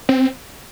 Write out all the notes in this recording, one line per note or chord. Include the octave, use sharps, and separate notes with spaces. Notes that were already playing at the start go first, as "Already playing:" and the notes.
C4